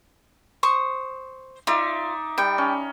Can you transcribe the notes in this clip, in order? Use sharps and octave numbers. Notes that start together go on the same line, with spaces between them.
C5 C#6 D#6
D#4 F4 D5 E5
G3 G5
C#4